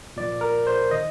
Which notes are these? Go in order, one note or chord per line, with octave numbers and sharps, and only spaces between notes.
A#2 F3 D5
A#4
C5
D#3 D#5